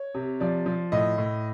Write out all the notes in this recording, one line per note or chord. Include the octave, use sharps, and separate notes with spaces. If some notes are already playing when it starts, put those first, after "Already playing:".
Already playing: C#5
C3
F3 D5
F3
A2 D#5
A2